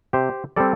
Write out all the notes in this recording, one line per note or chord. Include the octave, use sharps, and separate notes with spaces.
C3 G4 C5
G3 C4 A4 D5